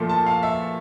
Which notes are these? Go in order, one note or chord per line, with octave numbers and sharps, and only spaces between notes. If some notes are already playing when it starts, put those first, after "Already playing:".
Already playing: A#2 F3 A3
A5
F5
E5